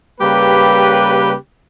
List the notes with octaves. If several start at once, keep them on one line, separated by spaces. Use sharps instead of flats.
C#3 G3 A#3 G4 B4